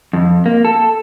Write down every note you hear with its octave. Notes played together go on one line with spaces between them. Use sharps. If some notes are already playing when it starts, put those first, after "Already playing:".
F2
A#3
A4